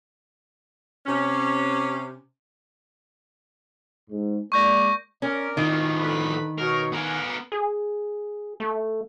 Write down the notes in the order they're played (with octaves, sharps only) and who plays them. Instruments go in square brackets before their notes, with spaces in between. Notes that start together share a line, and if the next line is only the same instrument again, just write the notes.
[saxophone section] C3 C#4
[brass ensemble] G#2
[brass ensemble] G#3 A#3 D5 [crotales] C#6 G6 A#6
[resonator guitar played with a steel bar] C#4 [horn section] A#4 D5
[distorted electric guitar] A2 F3 [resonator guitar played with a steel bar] D#3
[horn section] D3 B4 B5
[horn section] B2 D#4 C#5 [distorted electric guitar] A#4
[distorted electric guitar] B3 A#4 [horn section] F#5 G#5
[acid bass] G#4
A3